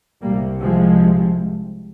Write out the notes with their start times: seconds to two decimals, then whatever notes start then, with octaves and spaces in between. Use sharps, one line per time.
0.21 C2 C3 G3 A#3
0.60 F3 G#3